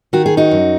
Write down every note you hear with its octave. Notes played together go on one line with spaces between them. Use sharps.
D#3 F#4
G#4
D#4 F#4
F#2